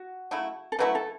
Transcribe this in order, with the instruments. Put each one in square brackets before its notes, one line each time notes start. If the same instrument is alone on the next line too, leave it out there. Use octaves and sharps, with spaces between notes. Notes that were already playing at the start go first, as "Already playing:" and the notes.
Already playing: [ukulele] F#4
[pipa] C#3 F#3 A3 E4
[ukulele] A4
[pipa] C#3 F#3 A3 E4 [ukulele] B4
[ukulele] A4